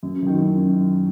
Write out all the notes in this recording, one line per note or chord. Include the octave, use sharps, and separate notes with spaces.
F#2
D#3 F#3
F#2